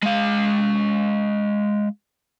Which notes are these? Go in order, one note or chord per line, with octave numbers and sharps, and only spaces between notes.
G#3 F5